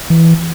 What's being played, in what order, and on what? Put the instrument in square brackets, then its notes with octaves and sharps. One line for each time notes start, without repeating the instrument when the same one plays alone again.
[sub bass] E3